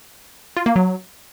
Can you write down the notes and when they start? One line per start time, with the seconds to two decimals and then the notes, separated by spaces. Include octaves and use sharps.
0.57 F4
0.66 A#3
0.76 F#3